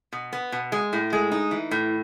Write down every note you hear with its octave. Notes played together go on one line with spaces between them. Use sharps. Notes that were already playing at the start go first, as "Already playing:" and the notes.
B2
B3
B2
G#3
A2
G#3
D#4
E3
A2